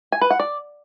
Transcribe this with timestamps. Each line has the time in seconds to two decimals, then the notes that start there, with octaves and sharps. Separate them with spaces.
0.12 G#5
0.21 B4
0.30 F#5
0.40 D5